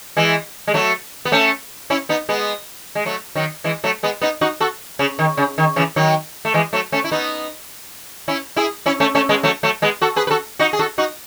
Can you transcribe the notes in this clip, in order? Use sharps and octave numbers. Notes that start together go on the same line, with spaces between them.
E3 G#3
G#3
F#3 A3
B3
A3 C#4
C#4 E4
B3 D#4
G#3 B3
G#3
F#3 A3
D#3 F#3
E3 G#3
F#3 A3
G#3 B3
B3 D#4
D#4 F#4
F#4 A4
C#3
D#3
C#3
D#3
C#3 E3
D#3 F#3
A3
E3 G#3
F#3 A3
A3 C#4
E4
B3 D#4
C#4 E4
E4 G#4
C#4 E4
A3 C#4
A3 C#4
G#3 B3
F#3 A3
F#3 A3
G#3 B3
F#4 A4
G#4 B4
B4
F#4 A4
D#4 F#4
G#4
F#4 A4
D#4 F#4